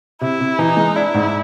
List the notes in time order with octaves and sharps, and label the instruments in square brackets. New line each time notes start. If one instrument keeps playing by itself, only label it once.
[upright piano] C3 [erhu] E4
[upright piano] C3
[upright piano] E3 [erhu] D#4
[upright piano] G#3
[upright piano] D4 [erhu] E4
[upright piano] G#2